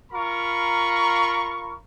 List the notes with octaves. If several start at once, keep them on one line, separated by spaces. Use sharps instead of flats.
F4 A#4 A#5 B5 C#6